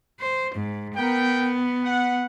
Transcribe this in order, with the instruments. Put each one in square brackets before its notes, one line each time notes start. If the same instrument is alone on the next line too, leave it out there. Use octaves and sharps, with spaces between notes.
[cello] C5
G#2
[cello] B3 [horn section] A#4 G5
[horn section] F#5